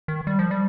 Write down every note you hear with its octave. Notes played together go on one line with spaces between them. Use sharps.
D#3
G3
F3
G3